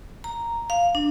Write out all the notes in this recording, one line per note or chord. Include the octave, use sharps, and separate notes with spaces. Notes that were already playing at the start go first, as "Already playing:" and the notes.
A#5
F5
D4